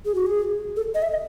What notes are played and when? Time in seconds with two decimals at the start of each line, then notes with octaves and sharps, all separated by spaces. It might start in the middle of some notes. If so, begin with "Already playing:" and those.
0.05 G#4
0.15 F#4
0.26 G#4
0.76 A4
0.95 D#5
1.02 E5
1.12 D#5